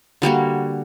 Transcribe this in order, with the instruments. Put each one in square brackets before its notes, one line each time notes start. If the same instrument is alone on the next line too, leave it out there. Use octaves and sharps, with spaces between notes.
[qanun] D3 G3 A#3 F#4